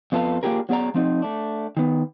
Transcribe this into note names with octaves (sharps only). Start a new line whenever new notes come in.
F2 B3 F4 A4 B4 F5
A#3 D4 F4 G4 G#4 A#4
F#3 B3 G#4 D5 A#5
F3 C4 D#4
A3 D4
D#3 B3